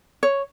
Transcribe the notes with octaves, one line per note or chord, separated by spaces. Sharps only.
C#5